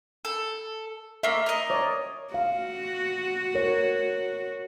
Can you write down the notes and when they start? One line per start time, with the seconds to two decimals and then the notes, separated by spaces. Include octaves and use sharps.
0.25 A4
1.23 A3 A#3 E5
1.46 A#4 D#5
1.70 C#5 D5
2.34 F#4 F5
3.54 A#4 C#5